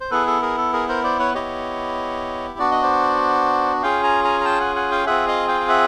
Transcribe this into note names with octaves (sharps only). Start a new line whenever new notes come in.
C5
B3 E4 G#4 A4 B4
A4
G#4 A#4
A4
G#4 A#4
A#4 C5
C5 D5
B4 C#5
B3 E4 G4 C#5 D#5
B3 D4 F#4 D5
D#5
C5 D5
C#4 F4 G#4 F5 G5
G#5 A#5
G#5 A#5
A#5
G5 A5
F#5 G#5
F#5 G#5
F5 G5
C4 F4 G#4 E5 F#5
D#5 F5
F5 G5
F5
E5 F#5